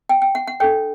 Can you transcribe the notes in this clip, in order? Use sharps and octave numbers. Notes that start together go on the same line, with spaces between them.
G5
G5
F#5
F#5
D4 A4 C#5 G5